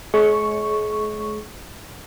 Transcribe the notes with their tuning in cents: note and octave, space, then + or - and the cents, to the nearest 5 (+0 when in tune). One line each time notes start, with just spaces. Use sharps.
G#3 +40 C#5 +15 C#6 +0